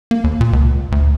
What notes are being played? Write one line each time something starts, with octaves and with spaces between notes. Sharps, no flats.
A#3
D#2
A#2
C#2
D2